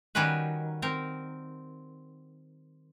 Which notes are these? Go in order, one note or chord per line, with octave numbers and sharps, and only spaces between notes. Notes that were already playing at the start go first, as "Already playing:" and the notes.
D#3 G3 C#4 F#4 B4
C4 A#4